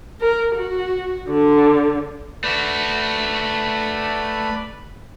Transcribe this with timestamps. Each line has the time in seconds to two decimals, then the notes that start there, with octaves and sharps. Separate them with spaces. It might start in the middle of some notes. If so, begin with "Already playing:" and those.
0.21 A#4
0.56 F#4
1.30 D3
2.44 A3 F#4 B4 D5 B5